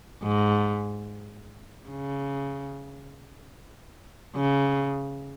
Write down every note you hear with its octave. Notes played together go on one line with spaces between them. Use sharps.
G#2
C#3
C#3